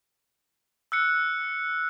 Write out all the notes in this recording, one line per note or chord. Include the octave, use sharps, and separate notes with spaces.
E6 F#6 C#7